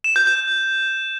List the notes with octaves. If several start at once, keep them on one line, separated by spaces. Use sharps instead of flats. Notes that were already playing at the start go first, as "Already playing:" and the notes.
E7
G6
G6